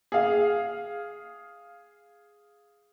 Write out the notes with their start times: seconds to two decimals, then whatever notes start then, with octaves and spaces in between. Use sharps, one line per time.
0.12 G#4 F5